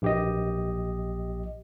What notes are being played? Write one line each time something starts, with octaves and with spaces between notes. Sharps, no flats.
A#1 G4 D#5